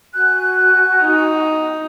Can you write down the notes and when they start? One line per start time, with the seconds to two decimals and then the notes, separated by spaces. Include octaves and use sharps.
0.14 F#4 G#5 F#6
1.01 D#4